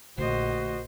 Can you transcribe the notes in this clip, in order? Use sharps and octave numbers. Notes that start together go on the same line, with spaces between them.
A#1 D3 A3 F#4 C5 D#5